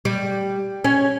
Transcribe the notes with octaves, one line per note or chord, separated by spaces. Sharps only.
G3
C#4